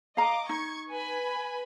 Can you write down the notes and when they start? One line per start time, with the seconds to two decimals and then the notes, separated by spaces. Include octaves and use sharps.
0.17 D#5 F5 A#5 D6
0.49 D#4 C#6 G#6
0.92 B4 G#5 B5